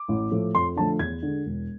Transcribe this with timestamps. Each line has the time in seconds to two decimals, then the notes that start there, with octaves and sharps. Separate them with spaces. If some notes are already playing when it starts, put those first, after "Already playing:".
Already playing: D6
0.09 A1
0.31 A2 F3 A3
0.55 F2 C6
0.76 D3 F3 A3 A5
0.99 E2 G#6
1.22 D3 G#3
1.46 E1